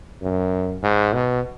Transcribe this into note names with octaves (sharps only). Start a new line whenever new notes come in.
F#2
G#2
B2